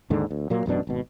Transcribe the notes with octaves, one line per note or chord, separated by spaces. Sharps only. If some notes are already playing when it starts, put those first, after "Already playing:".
D#2 G#2 D3
D2
A#2 F#3 A#3
A1 F#2 B2 D4
G#1 B2